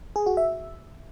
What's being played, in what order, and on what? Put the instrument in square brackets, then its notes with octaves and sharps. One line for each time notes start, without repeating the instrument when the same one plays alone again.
[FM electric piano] G#4
F#4
E5